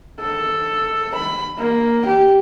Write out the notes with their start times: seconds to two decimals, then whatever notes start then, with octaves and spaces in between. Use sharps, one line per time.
0.21 A4
1.15 B5
1.58 A#3
2.06 G4